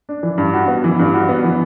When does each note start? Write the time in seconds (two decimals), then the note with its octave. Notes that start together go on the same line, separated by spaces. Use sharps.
0.09 D4
0.23 E3
0.38 G2
0.54 F#4
0.68 B3
0.84 E3
0.99 G2
1.14 F#4
1.29 B3
1.44 E3